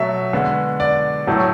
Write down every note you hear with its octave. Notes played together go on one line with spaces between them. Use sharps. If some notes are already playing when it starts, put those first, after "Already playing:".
Already playing: B2 F#3 A3 E5
D3 G#3 B3
D5
A2 F#3 A3